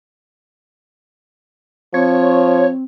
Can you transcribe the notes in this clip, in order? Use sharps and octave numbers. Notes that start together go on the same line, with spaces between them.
F3 C4 C#5